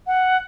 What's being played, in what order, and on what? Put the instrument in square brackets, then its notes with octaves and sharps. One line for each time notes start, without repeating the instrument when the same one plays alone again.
[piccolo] F#5